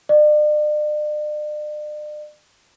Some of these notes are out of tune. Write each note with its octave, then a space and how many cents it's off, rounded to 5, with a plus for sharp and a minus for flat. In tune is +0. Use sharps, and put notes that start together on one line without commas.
D5 +40